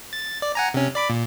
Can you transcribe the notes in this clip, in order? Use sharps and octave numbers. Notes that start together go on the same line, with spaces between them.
A6
D5
F#5 G#5 A#5
C3 C#4
D5 B5 D6
A#2